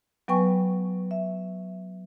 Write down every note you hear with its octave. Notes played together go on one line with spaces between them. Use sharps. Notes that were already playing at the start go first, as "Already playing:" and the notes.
F#3 B3 B4 G5 G#5 C#6
E5